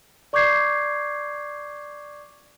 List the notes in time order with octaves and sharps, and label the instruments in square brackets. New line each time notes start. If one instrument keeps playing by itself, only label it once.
[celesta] D5 C#6 D6 G6 G#6 C7